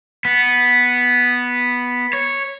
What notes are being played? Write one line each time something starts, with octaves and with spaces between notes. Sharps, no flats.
B3
C#5